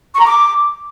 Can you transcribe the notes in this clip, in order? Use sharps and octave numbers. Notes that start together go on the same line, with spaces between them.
C#6
A#5
D6